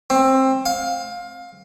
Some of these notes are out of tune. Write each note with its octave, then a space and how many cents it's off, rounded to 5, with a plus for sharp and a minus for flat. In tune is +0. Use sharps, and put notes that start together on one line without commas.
C4 +20
F5 +20